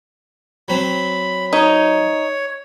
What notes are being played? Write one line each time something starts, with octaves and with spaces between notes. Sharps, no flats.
F#3 C4 B5
D#4 C#5